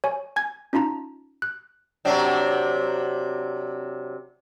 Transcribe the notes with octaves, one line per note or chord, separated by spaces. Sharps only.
C#5 G#5
G#5 G#6
C#4 D#4 F4 A5 A#5
F#6
C3 F#3 D4